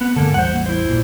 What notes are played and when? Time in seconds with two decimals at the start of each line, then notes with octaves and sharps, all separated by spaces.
0.01 B3
0.16 G#2 D3 A#3 A4
0.34 A1 E2 G3 C5 F#5
0.54 A#3
0.66 E4 C5
0.89 A#1 A#2